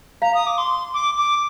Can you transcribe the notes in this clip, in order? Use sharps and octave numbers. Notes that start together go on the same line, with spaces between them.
F5 A#5
D#6
D6
C6
D6
D6